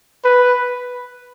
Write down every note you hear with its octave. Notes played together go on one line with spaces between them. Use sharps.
B4